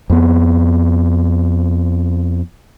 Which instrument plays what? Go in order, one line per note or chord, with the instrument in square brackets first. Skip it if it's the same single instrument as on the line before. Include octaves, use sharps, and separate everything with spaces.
[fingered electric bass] F2 B3